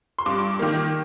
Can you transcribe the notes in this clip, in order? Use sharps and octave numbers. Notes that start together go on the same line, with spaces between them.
C6
G2 D6
D#3 A#3